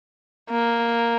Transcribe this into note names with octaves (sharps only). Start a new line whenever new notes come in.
A#3